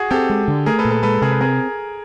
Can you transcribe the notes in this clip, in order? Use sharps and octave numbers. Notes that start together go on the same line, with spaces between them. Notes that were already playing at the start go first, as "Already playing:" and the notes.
Already playing: F#4 G#4
C4 G4 A4
G#3
D3
A3 G#4 A#4
A4 B4
A#2
A4 B4
G#3 A4 B4
C3 G#4 A#4
B4
C4 G#4 A#4